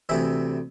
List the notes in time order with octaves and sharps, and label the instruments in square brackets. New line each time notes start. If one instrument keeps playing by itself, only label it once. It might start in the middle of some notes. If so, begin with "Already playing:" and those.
[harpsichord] D2 C3 E3 E4 E5